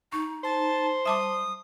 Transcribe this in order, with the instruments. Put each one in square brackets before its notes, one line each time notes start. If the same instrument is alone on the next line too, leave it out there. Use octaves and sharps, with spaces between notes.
[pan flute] D#4 [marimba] C#6
[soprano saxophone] C5 [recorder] A5
[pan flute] G3 [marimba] E5 A5 D6 [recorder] D#6